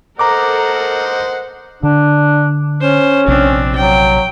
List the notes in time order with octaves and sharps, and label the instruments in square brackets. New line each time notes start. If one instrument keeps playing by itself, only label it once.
[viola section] A4 A#4 [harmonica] C5 D#5 F#5 [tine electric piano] A#5 D6
[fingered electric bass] D3 [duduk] D4
[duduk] C#4 [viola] C5
[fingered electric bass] A#1 C3 [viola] C4 D4
[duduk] F#3 [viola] G5